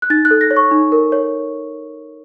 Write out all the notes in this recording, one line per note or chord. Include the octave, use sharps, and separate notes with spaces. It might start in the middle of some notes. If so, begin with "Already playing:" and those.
F#6
D#4 A6
F#6
A4
A#6
C#5
C#6
D#4
A#4
C#5